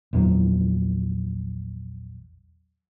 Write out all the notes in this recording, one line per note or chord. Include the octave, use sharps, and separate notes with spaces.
A#1 E2 F#3